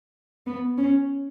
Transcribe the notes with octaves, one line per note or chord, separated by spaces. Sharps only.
B3
C#4